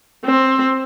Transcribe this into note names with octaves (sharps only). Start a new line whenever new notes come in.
C4